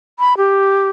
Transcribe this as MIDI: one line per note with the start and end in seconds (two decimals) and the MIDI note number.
0.19 0.37 83
0.37 0.90 67